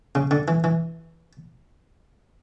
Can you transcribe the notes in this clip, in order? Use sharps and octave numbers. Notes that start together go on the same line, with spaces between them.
C#3
D3
E3
E3